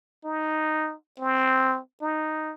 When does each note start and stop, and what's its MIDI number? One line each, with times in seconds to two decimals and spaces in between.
0.25 0.95 63
1.20 1.80 60
2.02 2.54 63